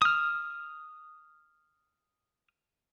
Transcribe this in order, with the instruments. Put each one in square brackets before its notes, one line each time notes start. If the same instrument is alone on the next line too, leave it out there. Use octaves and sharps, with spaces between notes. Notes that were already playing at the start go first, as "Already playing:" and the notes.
[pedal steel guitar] D#6 F6